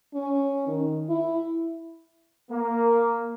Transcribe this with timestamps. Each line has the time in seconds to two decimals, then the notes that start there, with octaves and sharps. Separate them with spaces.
0.14 C#4
0.67 D#3
1.09 E4
2.51 A#3